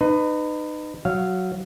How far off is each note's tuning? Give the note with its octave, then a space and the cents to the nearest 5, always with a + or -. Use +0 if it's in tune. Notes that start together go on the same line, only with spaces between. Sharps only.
D#4 -30 B4 +20
F#3 +0 F5 -10